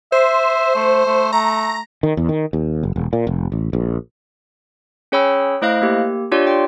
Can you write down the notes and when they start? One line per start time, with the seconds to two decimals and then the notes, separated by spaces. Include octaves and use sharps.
0.12 C5 E5
0.75 A3
1.06 A3
1.33 A3 A#5
2.03 D#3
2.17 E2
2.29 D#3
2.53 D#2
2.83 F#1
2.96 E1
3.13 A#2
3.27 F1
3.52 A1
3.73 A#1
5.12 C#4 G#4 C#5 G5 B5 E6
5.62 A3 E4 C5 D#5 F5 F#6
5.82 A#3 G4
6.32 D4 F4 G4 C#5 D5 C6
6.47 G5